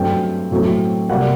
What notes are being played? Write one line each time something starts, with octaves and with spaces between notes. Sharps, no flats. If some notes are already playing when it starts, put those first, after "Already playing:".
Already playing: G2 F#3 A3 C4 G5
A2 F#3 A3 C4
C3 G3 A#3 F#5